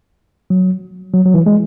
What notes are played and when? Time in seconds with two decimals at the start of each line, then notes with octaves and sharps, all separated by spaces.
0.50 F#3
1.14 F#3
1.25 F#3
1.34 E3
1.46 G#3